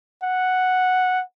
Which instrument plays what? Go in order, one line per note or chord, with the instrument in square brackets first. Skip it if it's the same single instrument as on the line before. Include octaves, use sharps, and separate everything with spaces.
[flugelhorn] F#5